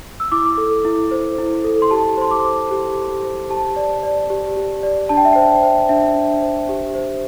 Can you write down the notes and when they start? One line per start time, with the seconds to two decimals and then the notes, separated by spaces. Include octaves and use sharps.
0.20 E6
0.32 E4 D6
0.58 A4
0.85 E4
1.11 C5
1.38 E4
1.64 A4
1.82 C6
1.91 G4 A5
2.17 C5 C6
2.31 D6
2.44 C5
2.71 G4
2.97 G4
3.24 C5
3.50 G4 A5
3.76 D5
4.03 D5
4.30 G4
4.57 G4
4.83 D5
5.09 D4 A5
5.17 G5
5.25 E5
5.33 C5 G5
5.63 C5
5.89 D4 E5
6.16 D4
6.42 C5
6.69 G4
6.95 C5